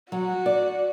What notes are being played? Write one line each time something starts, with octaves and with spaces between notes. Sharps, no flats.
F#3 F#4
D5